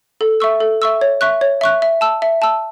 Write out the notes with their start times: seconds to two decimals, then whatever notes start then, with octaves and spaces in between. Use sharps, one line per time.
0.21 A4
0.40 E5 C#6 E6
0.60 A4
0.82 E5 C#6 E6
1.01 C#5
1.21 E5 C#6 F#6
1.41 C#5
1.61 E5 C#6 F#6
1.82 E5
2.01 A5 E6
2.22 E5
2.42 A5 E6